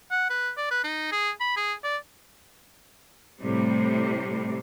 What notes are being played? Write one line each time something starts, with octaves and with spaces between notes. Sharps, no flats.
F#5
B4
D5
B4
D#4
G#4
B5
G#4
D5
A2 C3 G3